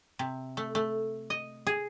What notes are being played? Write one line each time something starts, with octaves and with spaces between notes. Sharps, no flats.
C3
A3
A3
D#5
G#4